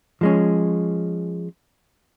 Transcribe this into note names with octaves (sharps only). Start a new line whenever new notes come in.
F3 G#3 C#4